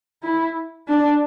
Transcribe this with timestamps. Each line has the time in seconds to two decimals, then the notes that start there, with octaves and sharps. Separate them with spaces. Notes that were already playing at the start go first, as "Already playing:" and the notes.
0.23 E4
0.88 D4